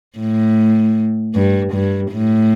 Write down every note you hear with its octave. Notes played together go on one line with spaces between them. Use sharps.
A2
G2
G2
A2